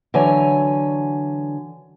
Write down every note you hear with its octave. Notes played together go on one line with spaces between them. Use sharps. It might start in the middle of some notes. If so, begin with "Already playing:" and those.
D3 E3 F#3 C#5 G#5